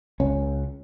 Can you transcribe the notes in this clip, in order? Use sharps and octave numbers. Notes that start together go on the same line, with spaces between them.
C#2 C#4